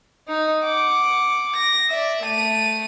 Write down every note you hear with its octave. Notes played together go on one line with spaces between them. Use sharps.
D#4
F#5 D6
A#6
D5 E5
A3 D#7